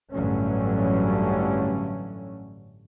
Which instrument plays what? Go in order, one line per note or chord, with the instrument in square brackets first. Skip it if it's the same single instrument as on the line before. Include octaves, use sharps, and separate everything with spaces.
[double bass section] A1 G2 D3 F#3 A3 C#4